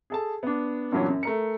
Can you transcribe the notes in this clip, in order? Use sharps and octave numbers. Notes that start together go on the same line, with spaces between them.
G#4 A4 A5
B3 D4
G2 A#2 E3 F#3 B3 C#4
F#2
A3 A#4 C#7